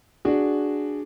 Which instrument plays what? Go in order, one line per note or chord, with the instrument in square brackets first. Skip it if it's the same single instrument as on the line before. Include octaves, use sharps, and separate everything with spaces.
[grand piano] D4 F#4 G#4